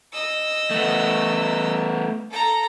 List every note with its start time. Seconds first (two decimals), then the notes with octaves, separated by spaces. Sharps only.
0.13 D#5 E6
0.71 A3 B3
2.31 A4 A#5